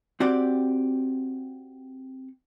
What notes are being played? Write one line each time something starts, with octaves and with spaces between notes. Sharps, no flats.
C4 F#4 G4 D5